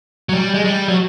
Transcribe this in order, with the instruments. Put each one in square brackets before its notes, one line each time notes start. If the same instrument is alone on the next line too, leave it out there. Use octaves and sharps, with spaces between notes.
[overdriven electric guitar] F#3
G3
G#3
G3
F#3